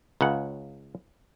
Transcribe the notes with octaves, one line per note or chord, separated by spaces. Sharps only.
C#2 C#3 F#5